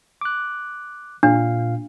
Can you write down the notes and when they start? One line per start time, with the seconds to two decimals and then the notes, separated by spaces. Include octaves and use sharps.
0.21 D6 F#6
1.23 A#2 D4 F5